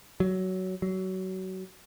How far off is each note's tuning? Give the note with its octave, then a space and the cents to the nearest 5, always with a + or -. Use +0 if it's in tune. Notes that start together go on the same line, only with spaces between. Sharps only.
F#3 +15
F#3 +25